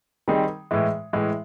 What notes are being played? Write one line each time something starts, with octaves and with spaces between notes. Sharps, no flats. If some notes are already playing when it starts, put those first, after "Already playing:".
D#3 G3 C4 D#4 G#4
A2 E3 G#3
A2 E3 G#3